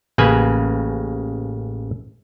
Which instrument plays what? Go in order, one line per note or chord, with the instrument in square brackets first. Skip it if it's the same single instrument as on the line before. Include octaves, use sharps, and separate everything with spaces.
[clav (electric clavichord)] A1 C#3 A#3 B4 G#5